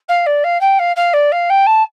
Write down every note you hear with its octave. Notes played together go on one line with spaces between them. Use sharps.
F5
D5
F5
G5
F5
F5
D5
F5
G5
A5